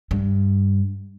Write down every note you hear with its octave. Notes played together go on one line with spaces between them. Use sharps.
G2